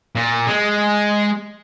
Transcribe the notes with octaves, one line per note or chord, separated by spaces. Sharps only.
A#2
G#3